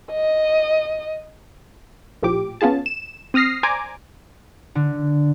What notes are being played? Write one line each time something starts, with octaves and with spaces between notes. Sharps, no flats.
D#5
A#1 A2 F3 G4 D6
B3 C#4 F4 G#4 A5
E7
C4 D#6 F6 A#6 C7
C5 D5 G#5 A#5 D6
D3